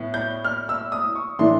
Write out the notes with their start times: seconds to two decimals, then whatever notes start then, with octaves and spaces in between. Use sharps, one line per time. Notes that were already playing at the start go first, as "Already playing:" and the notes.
Already playing: A2 B3
0.14 G6
0.45 F6
0.69 E6
0.92 D#6
1.15 C#6
1.39 A2 E3 A3 D4 C6